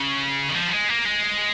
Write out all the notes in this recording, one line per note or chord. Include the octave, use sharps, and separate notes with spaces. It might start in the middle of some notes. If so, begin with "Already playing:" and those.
Already playing: C#3
D#3
F3
G3
G#3
A#3
G#3